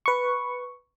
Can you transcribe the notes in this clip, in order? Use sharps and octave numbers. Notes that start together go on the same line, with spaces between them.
B4 C#6